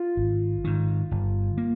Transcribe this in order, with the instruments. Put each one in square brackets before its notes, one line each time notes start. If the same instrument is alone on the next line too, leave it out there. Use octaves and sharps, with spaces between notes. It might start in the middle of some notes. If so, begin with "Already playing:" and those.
Already playing: [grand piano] F4
[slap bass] G#1
G#2 D#3
G1
A#3